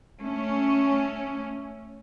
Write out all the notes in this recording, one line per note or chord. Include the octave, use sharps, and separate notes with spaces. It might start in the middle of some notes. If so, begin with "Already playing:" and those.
A3 C#4